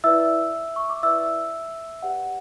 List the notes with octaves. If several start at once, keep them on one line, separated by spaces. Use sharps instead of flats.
E4 B4 D5 E5 E6
C#6
D6
E4 B4 D5 E5 E6
G4 B4 D5 F#5